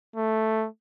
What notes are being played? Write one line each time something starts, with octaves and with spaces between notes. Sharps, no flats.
A3